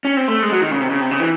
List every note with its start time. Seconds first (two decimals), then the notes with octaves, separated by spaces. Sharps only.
0.05 C#4
0.17 C4
0.28 A3
0.43 G#3
0.52 F#3
0.61 D#3
0.71 C#3
0.81 C3
0.90 C#3
1.01 C3
1.11 C#3
1.20 E3